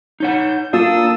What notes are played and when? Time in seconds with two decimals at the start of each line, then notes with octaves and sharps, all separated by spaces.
0.20 D#4 C#5 F#5 G6
0.73 A#3 D4 F4 A4 D#6 E6